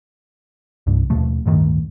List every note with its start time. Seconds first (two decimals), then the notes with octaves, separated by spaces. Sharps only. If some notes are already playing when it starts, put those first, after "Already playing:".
0.87 C2 G2
1.10 D#2 B2 F3 A3
1.46 D1 G2 D#3 A3